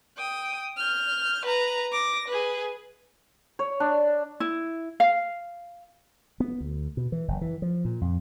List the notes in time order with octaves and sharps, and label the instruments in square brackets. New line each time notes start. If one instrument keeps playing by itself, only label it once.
[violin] G5 D#6
F6 G6
B4 A#5
D6 A#6
G#4 B4
[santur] C#5
D4
[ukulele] E4
F5
[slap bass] B3
D2
B2
E3
F#1
E3
F3
A#2
F2